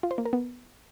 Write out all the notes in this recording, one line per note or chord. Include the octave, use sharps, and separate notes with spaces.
F4
C5
A#3
A#4
B3